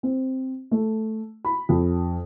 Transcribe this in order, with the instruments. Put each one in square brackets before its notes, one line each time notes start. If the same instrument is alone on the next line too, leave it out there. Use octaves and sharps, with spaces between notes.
[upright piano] C4
A3
B5
F2